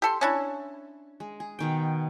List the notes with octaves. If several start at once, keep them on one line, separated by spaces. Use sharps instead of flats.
G4 A4 C6
C#4 D4 E4
G#3
G#4
B2 D#3 G5